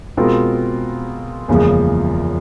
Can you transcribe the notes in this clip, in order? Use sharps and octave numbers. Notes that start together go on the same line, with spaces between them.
B2 G#3 C4 F4 A#4
F#1 E2 C#3 F3 G#3